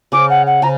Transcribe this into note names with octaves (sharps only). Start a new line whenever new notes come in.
C#3 C#4 D6
F#5
F#5
C#3 A#5